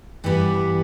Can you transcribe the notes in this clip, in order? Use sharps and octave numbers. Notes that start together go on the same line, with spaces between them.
G2 E3 G3 B3 E4